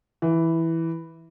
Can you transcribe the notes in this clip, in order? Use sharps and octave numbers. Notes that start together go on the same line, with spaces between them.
E3